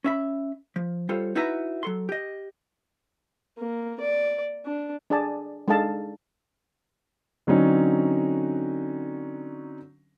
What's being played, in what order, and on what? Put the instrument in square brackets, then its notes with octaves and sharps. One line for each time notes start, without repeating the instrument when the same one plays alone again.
[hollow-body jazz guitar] C#4 E5 B5
F3
G3 F4 A4 C5 C#5
D#4 E4 F#4 B4 E5 A#5
F#3 A4 C6
G4 D#5
[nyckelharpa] A#3
D5
D4
[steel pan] D4 G#4 D5 G#5 A5
G#3 D4 D#4 A4 F5 A5
[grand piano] D3 F#3 C4 C#4 D#4